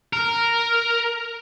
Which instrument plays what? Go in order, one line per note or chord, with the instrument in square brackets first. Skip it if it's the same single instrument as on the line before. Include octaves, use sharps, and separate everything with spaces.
[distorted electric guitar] A#4